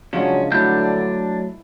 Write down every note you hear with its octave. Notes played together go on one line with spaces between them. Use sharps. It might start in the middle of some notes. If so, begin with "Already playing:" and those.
C#3 F3 F#3 G#3 C#4 D4 F4 D#5
D3 F#3 A3 D4 E4 A5 G6